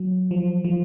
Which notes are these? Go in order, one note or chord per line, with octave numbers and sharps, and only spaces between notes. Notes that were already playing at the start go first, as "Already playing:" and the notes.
Already playing: F#3
F3
F3